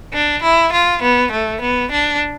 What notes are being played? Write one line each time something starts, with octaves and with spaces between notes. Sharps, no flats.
D4
E4
F4
B3
A3
B3
D4